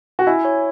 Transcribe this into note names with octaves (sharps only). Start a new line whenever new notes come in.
F#4
E4 G#5
C#5